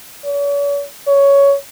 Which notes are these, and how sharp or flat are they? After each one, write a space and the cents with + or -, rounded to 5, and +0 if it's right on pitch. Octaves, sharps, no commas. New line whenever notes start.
C#5 +45
C#5 +10